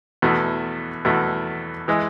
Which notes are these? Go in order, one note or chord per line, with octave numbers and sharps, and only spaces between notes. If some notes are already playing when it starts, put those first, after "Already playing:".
E2 B2 A3
E2 B2 A3
E3 G#3